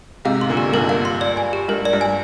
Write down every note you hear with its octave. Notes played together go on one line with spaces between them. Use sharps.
G#2 C3 F5
C6
A#2 D3
G4
G2 A#2 A#4
F5
C6
D5
G#5
G4
G2 A#4
D5
G2
G#5